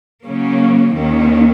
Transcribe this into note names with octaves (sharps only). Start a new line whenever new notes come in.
C#3 F#3 A#3 C#4
D#2 D#3 A#3 C#4